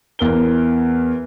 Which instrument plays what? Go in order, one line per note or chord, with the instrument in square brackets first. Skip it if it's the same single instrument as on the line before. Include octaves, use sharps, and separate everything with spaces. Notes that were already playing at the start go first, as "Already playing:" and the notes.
[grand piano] E2 A#4 G7